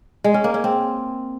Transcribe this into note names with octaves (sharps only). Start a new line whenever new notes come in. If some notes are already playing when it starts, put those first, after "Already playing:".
G#3
C#4
A#3
C#4
C4